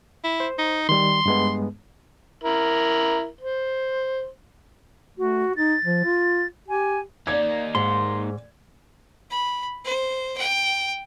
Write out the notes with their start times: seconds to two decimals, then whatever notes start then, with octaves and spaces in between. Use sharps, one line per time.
0.24 E4
0.40 C5
0.58 D#4
0.89 D#3 G3 C6
1.26 G2 G#3 B3
2.44 E4 A#4
3.41 C5
5.18 A3 F#4
5.56 D#4 A6
5.85 F3
6.04 F4
6.68 G4 G#5
7.27 A#3 D#4 D5 G#6
7.75 G#2 C6
9.30 B5
9.84 C5
10.37 G5